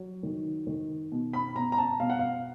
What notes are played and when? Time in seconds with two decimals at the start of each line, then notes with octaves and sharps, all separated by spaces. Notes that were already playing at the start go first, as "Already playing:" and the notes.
Already playing: F#3
0.23 D#3
0.67 D#3
1.12 B2
1.33 B5
1.55 B2 A#5
1.72 A#5
1.78 A5
1.99 B2 F5
2.10 F#5
2.19 F5